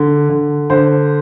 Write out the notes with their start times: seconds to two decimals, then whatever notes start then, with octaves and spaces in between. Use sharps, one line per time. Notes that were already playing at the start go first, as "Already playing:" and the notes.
Already playing: D3
0.30 D3
0.70 D3 C5